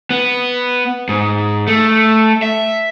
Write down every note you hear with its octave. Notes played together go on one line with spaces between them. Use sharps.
B3
G#2
A3
E5